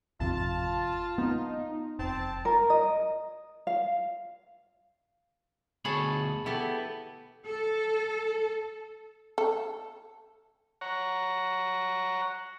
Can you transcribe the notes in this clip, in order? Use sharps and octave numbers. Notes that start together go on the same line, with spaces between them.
G#1 F2 C3 F4 A5
B3 D#4
F1 C4 A5
A#4
D#5
F5
D2 B2 G#4 C#5 A5 B5
B3 E4 G4 A4
A4
A4
C#5 F#5 A#5